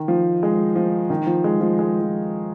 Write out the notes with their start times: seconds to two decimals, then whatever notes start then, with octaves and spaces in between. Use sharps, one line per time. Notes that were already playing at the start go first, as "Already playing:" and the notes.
Already playing: D#3
0.08 F3
0.43 G#3
0.76 F3
1.10 D#3
1.27 F3
1.44 G#3
1.61 F3
1.79 G#3
2.01 F3